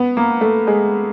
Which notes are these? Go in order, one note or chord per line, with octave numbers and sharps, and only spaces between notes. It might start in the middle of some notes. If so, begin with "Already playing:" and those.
Already playing: B3
A#3
A3
G#3